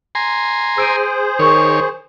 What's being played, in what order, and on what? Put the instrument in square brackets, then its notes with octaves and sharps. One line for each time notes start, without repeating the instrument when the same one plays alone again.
[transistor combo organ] G#5 A#5 C6
[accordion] G#4 C5 [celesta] E6 D7 D#7
[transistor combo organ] D#3 C#5 [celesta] A#4 C#6